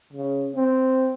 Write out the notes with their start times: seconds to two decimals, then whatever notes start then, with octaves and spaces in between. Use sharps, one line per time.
0.13 C#3
0.56 C4